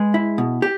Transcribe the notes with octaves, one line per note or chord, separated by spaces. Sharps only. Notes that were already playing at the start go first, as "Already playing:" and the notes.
Already playing: G#3 G#4 B4
E4
B2
G4